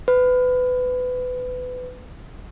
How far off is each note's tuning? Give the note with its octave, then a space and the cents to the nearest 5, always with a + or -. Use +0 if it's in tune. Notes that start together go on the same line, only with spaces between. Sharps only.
B4 +25